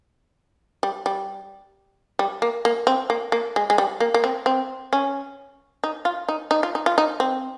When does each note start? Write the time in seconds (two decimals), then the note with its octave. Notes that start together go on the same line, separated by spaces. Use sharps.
0.83 G3
1.06 G3
2.19 G3
2.42 A#3
2.65 A#3
2.87 C4
3.10 A#3
3.32 A#3
3.56 G#3
3.70 G#3
3.78 G3
4.00 A#3
4.14 A#3
4.24 C4
4.46 C4
4.93 C#4
5.84 D#4
6.05 F4
6.29 D#4
6.51 D#4
6.63 F4
6.75 D#4
6.86 F4
6.98 D#4
7.20 C4